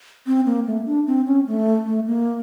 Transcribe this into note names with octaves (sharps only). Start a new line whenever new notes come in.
C4
A#3
A3
D4
C4
C#4
A3
A3
A#3